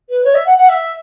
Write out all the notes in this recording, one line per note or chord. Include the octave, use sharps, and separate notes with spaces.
B4
C#5
E5
F#5
F#5
E5